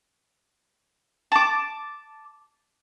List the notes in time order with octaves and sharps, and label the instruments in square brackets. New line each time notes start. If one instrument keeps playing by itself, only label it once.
[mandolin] A5 D6